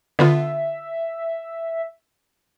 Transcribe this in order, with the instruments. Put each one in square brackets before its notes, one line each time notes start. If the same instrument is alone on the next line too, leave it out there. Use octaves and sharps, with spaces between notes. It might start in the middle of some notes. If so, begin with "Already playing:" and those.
[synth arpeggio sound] D3 B3 F4 [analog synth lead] E5